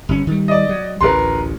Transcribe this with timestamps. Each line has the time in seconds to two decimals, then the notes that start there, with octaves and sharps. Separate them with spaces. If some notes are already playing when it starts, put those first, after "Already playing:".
0.09 G1 C#4
0.27 D#3 G3
0.48 D5 D#5
0.69 F#3
1.01 A1 D2 A#4 B4 C6